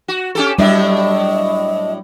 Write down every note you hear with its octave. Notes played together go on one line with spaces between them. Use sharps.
F#4
C#4 G4 A4
A2 F#3 G3 D4 D#5 E5